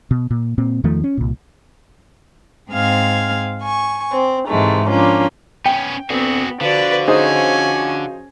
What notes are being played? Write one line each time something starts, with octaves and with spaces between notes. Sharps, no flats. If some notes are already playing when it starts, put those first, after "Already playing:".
B2
A#2
A#2 C4
E2 D#3 F3 A3
C#4
C2 A#2
G#2 C4 G#4 F5 F6 G#6
G#5 C#6
C4
G#2 C3 D#3 E3 G#3 A3
F3 A#3 C#4 D4 F4
B3 C#4 G5
D2 D3 B3 C4 F#4 G#4
D3 F3 F#4 B4 D5
C#4 D#4 G#4 C5 G#5